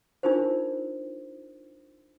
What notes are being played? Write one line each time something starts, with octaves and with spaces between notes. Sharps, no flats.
D4 D#4 F4 A#4 C5